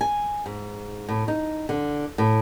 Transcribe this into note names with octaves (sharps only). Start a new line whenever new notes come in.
G#5
G#2
A2
D#4
D3
A2